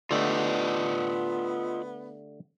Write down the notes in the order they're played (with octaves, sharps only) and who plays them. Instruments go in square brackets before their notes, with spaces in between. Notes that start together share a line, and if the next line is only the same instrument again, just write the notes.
[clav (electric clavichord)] D3 A3 G4 [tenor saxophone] B3 [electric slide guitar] F4 D5 D#5